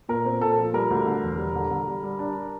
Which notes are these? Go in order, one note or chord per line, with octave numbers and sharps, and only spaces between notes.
A#2 A#4
C4
A#2 A4
F3
G3 A#4
D2
D3
E1
G3
D3
D3
G3
G3
D4
D4